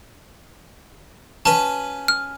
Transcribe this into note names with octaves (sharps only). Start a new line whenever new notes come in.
C#4 F#4 B4 A5
F6